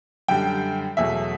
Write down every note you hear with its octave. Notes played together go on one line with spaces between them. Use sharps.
F#2 D3 G3 G5
E2 B2 F#3 A3 E5